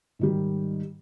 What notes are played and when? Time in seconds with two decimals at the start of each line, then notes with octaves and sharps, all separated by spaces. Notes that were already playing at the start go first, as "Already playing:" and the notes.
0.19 G#2 D#3 G3